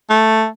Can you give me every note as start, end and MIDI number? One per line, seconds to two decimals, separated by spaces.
0.10 0.47 57